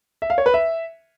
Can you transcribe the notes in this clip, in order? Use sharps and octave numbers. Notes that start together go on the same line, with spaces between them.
E5
F5
C#5
B4
E5